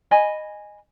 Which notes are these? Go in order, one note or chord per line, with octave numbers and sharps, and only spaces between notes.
D#5 G#5 B5